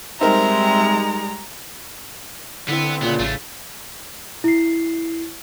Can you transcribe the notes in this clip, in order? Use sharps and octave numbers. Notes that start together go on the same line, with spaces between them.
G3 G#3 C4 D#4 A#4 C5 E5 A#5
D3 B3 C4 E4 D5
A#2 C#3 B3
A1 A3 D4
E4 C7